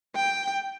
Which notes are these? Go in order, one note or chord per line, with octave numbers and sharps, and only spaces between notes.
G5